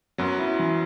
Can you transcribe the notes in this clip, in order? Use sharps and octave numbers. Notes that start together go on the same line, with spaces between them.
F#2 F#3 B3
E4
E3